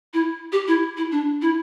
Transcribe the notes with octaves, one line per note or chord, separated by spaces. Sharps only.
E4
G4
E4
E4
D4
E4